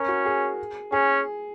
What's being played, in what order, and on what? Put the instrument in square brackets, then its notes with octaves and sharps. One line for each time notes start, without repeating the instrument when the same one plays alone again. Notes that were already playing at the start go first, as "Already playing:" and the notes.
Already playing: [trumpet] C#4 [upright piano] A#4
[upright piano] F#4
G#4
[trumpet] C#4 [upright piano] G#4